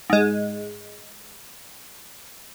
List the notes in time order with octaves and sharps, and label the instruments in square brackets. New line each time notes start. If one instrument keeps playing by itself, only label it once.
[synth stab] G#2 G#3